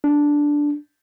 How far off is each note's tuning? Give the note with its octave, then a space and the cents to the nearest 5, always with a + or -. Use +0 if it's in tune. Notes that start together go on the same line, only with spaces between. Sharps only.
D4 -5